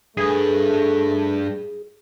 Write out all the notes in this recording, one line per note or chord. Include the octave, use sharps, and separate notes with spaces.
G2 A3 G#4 B4